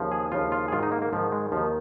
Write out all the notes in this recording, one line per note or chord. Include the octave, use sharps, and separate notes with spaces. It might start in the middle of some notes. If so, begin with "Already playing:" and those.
Already playing: D#2 C#3 F3
G#4
D#2 C#3 F3 F4
F4
G#4
G#2 D#3 F4
D#4
A#3
A#3
G#2 D#3 F3
G#3
D#2 D#3 F3